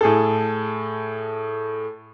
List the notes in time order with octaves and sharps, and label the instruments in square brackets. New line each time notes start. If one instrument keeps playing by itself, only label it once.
[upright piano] A2 G#4 A4